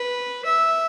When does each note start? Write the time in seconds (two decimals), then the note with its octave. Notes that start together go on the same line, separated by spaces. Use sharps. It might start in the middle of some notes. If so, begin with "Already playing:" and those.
Already playing: B4
0.45 E5